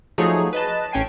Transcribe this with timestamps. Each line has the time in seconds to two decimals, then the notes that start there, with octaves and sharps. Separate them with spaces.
0.18 F3 F#3 A3 D#4 G#4 C#5
0.53 B4 D#5 A5
0.91 A1 C#4 G5 G#5 C7 D7